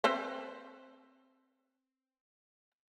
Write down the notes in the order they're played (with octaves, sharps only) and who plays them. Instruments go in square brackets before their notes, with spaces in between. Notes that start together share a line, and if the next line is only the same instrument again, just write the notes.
[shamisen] C4 B4 C5